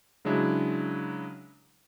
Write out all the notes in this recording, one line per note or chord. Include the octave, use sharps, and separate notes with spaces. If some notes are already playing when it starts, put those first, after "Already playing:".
C#3 F#3 G#3 D4 E4